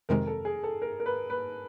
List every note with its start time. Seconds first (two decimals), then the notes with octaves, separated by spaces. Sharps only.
0.09 F2 C3 D#3 G#3 A#4
0.27 A4
0.45 G#4
0.64 A4
0.82 A#4
1.00 A#4
1.06 B4
1.30 B4